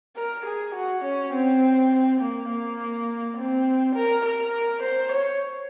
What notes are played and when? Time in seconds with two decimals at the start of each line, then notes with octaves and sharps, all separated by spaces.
0.16 A#4
0.46 G#4
0.75 F#4
1.04 C#4
1.33 C4
2.21 A#3
2.49 A#3
3.37 C4
3.95 A#4
4.25 A#4
4.83 C5
5.12 C#5